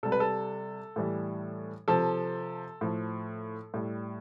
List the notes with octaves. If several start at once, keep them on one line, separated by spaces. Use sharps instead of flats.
C3 G3 A4
B4
A4
A2 E3 G3
C3 F3 A4
A2 F3
A2 G3